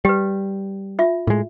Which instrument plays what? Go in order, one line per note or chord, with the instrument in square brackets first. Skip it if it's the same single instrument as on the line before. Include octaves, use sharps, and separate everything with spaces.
[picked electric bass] G3 [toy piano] G4 B4
[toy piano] F4 E5
[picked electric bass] A2 G#3